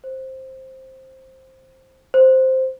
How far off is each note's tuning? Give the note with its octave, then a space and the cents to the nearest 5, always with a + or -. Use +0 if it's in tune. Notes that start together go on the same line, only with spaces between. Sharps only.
C5 +10
C5 +0